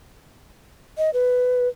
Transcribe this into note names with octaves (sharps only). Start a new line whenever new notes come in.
D#5
B4